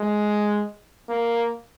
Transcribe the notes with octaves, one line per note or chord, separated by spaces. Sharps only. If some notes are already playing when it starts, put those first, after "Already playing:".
Already playing: G#3
A#3